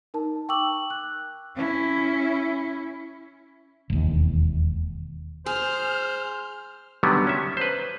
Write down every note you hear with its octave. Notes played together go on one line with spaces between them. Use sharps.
D#4 A#4 A5
G5 C#6 D6 E6 F#7
F#6
C#4 E4
E1 D#2
G#4 C5 F6
D3 D#3 F#3 G3 B3
C#4 E5
B4 C5